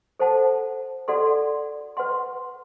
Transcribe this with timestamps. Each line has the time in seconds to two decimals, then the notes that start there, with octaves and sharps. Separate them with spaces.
0.19 A4 C5 F#5 A5
1.08 F#4 A4 D5 F#5 C6
1.97 B4 F#5 C6